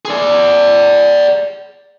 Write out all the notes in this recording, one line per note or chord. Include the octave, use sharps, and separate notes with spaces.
G#4 D5